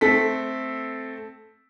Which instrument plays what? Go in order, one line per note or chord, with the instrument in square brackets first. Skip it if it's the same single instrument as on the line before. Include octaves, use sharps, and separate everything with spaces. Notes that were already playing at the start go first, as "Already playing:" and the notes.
[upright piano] A3 C4 A4 B6